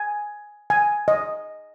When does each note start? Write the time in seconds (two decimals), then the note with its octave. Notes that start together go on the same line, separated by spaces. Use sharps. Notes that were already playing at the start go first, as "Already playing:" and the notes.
Already playing: G#5
0.70 G#5
1.08 D#5